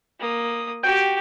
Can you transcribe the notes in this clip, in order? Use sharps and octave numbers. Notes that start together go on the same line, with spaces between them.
A#3 D#6
F#4 G4 G5